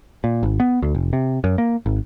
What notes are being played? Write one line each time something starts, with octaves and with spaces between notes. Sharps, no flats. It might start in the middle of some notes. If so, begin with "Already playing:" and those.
A#2
G#1
B3
D2
F1
C3
F#2
A#3
G#1